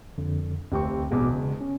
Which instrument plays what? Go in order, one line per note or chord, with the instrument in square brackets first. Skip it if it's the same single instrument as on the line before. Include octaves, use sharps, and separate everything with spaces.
[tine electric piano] F2 D3
[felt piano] F1 C4 C#6 [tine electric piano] D2 G4
[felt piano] E1 E2 G#3 [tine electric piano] A1 B2 D6
[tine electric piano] C#3
C#4